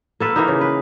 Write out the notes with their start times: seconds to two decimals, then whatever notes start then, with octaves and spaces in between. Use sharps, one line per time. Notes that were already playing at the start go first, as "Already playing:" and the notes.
0.20 A#3 A4 B4
0.36 E3 A#3 D#4
0.48 C#3
0.61 B4